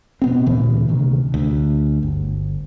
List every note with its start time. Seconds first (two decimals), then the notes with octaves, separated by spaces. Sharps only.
0.22 B2 B3 C4
0.46 D2 A#2 E3
0.89 D2 C3 D#3
1.34 D2
2.03 G1